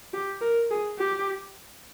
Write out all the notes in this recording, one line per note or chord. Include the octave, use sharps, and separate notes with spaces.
G4
A#4
G#4
G4